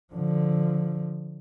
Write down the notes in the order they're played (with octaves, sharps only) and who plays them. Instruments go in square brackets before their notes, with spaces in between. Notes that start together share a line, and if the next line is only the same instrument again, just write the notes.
[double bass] D3 F3